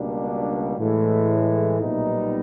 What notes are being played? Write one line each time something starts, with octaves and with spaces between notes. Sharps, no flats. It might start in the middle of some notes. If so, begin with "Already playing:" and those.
Already playing: C#2 B2 G3 A#3 D4
A2 E3 G#3
B1 A#2 G3 B3 D#4